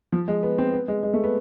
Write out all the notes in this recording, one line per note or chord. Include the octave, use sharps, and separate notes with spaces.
F3
G#3
B3
C4
B3
G#3
G#3
A3
B3